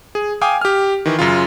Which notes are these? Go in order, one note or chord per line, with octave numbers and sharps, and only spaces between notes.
G#4
F5 G5 G#5 D6 D#6
G4 F6
D#3 E3
F#2 C#3 F4